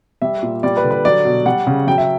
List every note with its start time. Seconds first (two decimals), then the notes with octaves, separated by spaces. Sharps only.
0.22 G3 E5
0.43 A#2
0.63 G3 D5
0.77 B4
0.84 D3
0.91 B4
1.05 F#3 D5
1.25 B2
1.46 G3 F#5
1.67 C#3
1.87 F#3 G5
1.98 E5